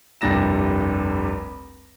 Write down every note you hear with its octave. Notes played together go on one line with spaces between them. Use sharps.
F1 C2 G2 G3 A#6 E7